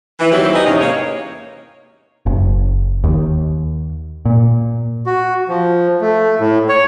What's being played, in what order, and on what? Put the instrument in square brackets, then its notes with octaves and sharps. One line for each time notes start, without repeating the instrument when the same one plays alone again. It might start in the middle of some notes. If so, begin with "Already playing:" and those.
[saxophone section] E3
D#2 D#3 F#3 C4 E4 G4
D#4 G#4 B4 C#5 D#5
E2 G#2 C3 E3 C#4 D#4
A#3 C#5
[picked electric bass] F#1
D#2
A#2
[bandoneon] F#4
F3
A3
A2
C#5